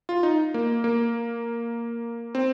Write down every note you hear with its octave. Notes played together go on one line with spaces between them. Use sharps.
F4
D#4
A#3
A#3
C4